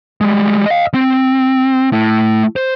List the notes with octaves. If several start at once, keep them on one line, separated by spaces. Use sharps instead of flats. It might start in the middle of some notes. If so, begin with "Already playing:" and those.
G3 G#3
D#5 F5
C4
A3 E4
C5